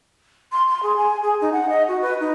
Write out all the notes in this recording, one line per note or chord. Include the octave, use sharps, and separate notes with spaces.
C6
C6
G#4
G#5
G#4
D#4
F#5
D#5
F#4
B4
D#4